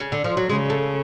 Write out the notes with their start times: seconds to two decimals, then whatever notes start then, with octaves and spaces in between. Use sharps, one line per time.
0.00 C#3
0.12 D3
0.24 F3
0.37 F#3
0.49 C#3 G#3
0.70 A3